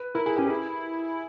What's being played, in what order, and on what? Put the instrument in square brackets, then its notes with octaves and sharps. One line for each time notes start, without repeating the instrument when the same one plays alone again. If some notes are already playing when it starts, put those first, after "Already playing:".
Already playing: [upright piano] B4
[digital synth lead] E4 [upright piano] A#4
[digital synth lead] E4 [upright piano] G#4
[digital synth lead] C#4 [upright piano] G4
[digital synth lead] E4 [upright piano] G#4